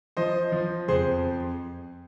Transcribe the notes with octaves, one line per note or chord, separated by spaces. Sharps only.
F3 C5 D#5
F3
F2 G#4 C5